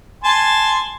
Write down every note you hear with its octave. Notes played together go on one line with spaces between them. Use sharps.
G#5 A5 C6